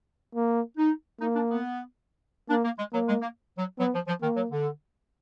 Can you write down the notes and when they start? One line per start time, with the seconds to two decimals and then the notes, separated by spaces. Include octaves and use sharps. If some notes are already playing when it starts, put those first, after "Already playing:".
0.35 A#3
0.78 D#4
1.21 A#3 D#4
1.35 D4
1.50 B3
2.50 A#3 D4
2.64 A#3
2.78 G#3
2.93 F#3 A#3
3.08 G#3
3.22 A#3
3.57 F#3
3.79 F#3 B3
3.94 F3
4.07 F3
4.22 D#3 A#3
4.36 F#3
4.50 D3